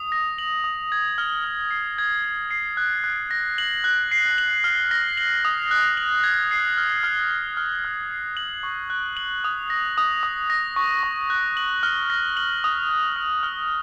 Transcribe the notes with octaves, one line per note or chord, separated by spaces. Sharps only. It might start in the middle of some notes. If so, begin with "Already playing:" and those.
Already playing: D#6
A#6
F#7
D#6
G#6
F6
F6
C7
G#6
G#6
C7
F#6
F#6
A#6
F#7
F#6
C7
F#7
F6
A#6
F#7
D#6
F#6
F#7
G#6
C7
F6
F6
C7
F6
F6
C7
F#7
C#6
F#6
F#7
D#6
A#6
D#6
D#6
A#6
C#6
C#6
F#6
F#7
F6
A#6
F#7
D#6
F#6
F6
F6